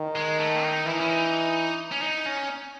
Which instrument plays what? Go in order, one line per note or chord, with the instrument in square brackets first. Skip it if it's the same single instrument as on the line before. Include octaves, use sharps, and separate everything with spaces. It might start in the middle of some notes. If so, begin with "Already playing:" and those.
Already playing: [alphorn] D#3
[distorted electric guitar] G#3
A3
D#4
[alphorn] E3 [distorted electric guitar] E4
[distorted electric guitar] D#4
C#4
D#4
C#4
D#4
C#4